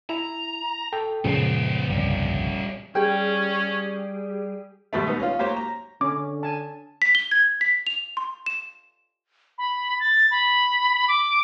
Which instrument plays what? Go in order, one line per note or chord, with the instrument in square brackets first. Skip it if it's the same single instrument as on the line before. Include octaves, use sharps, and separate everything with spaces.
[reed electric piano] E4 [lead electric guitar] A#5
[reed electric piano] A4 G5
[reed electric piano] F#2 C#3 F3 [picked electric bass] A#2 G#3 C#4 [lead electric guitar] B3 C5
[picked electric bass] G1 C2 F2 [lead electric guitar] G3 C#4
[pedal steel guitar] G3 [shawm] C#4 [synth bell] G4 G#4 [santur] G5
[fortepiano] D#2 G#2 B2 G3 A3
B3 D#4
C#4 F4
F#3 A#3 G4 C5 C#5
A#5
[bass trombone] D3 [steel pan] C#4 [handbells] D6
[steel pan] G#5 A5
[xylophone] B6
G7
G#6
B6
F7
C6
E7
[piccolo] B5
A6
B5
D6